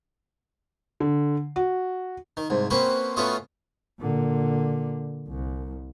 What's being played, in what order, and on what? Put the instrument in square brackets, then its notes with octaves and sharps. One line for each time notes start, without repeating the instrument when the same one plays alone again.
[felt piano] D3
F#4
[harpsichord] D#3
C2 G#2
A#3 C4 C#4 F#4 B4
A3 B3 C#4 F4 F#4 D#5
[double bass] A#2 D3
C2